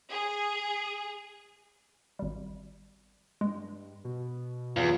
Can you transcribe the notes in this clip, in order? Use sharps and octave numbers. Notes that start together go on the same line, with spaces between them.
G#4
G#1 G3
G2 G#3
B2
E2 F4